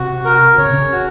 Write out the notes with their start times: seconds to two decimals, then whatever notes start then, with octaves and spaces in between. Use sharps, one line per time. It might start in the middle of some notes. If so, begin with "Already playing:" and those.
Already playing: C3 F#4
0.25 A#4
0.58 C#3 C#5
0.66 C3
0.73 C#3
0.92 F#4